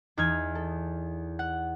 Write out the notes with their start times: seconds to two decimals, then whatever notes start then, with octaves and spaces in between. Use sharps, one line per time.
0.17 E2 D#4 F6 G#6
0.55 A4
1.39 F#5